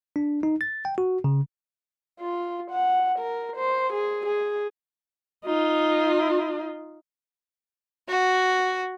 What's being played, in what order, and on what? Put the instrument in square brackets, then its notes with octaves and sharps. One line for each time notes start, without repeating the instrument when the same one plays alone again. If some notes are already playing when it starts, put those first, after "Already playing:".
[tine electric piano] D4
D#4
A6
G5
F#4
C#3
[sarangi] F4
F#5
A#4
C5
G#4
G#4
[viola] D#4 F4
[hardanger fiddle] F#4